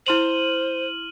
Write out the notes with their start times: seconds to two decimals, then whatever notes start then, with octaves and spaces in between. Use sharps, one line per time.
0.06 E4 C5 C6 F6 D#7 F7 F#7